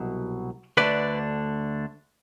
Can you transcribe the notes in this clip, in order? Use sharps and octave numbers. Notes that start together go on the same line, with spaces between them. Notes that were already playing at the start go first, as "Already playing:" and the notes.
Already playing: C2 B2 F#3
D2 D3 A3 D4 B4 D5